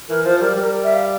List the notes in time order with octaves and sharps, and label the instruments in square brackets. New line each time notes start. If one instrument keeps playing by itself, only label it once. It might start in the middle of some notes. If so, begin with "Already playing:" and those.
[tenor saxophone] E3 [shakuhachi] A#4
[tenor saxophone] F3 [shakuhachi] C5
[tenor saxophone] G3 [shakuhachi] A#4
[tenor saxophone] G3 [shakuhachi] A#4
[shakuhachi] E5
F5